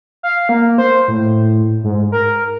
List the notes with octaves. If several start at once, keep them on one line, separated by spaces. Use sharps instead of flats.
F5
A#3
C5
A2
G#2
A#4